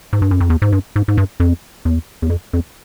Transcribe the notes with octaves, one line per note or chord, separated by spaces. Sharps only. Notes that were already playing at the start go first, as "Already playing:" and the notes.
G#2
G2
F#2
F2
E2
G#2
G2
G#2
G#2
G2
F2
E2
E2
F2
F2